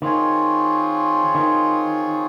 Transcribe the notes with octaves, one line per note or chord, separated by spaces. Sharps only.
D#3 C4 F4 G#4 C#5
D#3